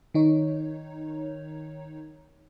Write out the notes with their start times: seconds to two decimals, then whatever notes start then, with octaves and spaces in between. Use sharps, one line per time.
0.14 D#3 D#4 C#5